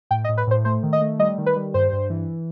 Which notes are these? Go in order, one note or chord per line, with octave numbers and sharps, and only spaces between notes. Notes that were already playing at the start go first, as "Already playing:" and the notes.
A2 G5
D#5
A2
B4
A2 C5
A3 C5
D#3
D#5
A3
G3 D#5
D#3
B4
G3
G2 C5
G2
E3